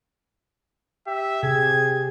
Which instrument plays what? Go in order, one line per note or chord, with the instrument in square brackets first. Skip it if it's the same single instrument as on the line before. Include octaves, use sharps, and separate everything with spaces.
[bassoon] G4 [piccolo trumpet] E5
[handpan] C3 [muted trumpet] G#4 [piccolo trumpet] G#6